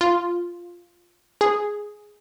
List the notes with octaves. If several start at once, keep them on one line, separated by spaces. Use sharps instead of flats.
F4
G#4